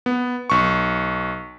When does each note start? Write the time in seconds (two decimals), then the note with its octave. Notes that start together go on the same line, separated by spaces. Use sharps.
0.06 B3
0.50 B1 C#6